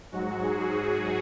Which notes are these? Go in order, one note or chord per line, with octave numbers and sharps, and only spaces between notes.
G#2 F#3 F#4
G#4
G#4